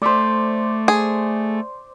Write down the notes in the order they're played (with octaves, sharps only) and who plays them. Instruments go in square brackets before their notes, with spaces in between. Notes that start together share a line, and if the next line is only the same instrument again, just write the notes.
[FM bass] A3 [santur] C5 D5
[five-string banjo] G#4